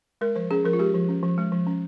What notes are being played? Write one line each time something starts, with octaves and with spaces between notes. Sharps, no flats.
G#3 A#4
F3 C5
C#4 G#4
F3 A#4
F4
G#3 G4
F3
C#4
F3
G#3
F3
C#4